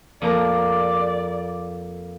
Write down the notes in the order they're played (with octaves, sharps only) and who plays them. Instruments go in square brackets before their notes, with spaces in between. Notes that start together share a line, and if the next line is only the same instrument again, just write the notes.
[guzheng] F2 A#3 A#5 [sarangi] D5